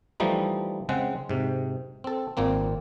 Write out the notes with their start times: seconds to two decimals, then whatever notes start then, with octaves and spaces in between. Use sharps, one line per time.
0.20 E3 F3 G3 A3 D#4
0.89 C#3 G#3 C4 F#5
1.29 G#2 C3
2.04 C4 A4
2.37 G#1 A#2 A#3 C4